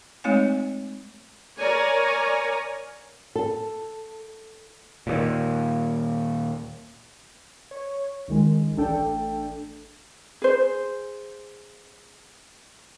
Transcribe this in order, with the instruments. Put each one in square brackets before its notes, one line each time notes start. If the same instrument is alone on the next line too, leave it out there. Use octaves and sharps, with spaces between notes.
[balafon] G#3 A3 C4 D#4 C#5 G#5
[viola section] A#4 C#5 D5 G#5 A#5
[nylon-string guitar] A4
[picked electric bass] D#2 A#2
[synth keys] C#5
C#2 D#3 G#3
A1 A3 D4 A4 G5
[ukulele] G#4 C5